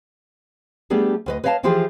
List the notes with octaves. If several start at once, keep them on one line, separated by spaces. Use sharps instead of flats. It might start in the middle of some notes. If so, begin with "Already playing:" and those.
G3 A3 B3 D4 G4 G#4
D2 B4 D#5
B4 C#5 D#5 F5 G5 A5
E3 F3 E4 F4 G4 G#4